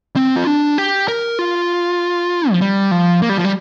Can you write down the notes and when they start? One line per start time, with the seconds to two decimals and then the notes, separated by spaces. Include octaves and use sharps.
0.16 C4
0.36 F4
0.47 D4
0.78 G4
1.08 A#4
1.39 F4
2.51 F3
2.61 G3
2.91 F3
3.22 A#3
3.29 G3
3.37 F3
3.45 G3